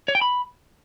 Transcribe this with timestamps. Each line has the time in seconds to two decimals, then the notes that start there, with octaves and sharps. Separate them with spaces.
0.08 C#5
0.15 G5
0.21 B5